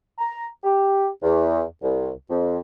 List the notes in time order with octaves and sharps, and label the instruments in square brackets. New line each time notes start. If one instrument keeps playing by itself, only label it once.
[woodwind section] A#5
G4
E2
C2
F2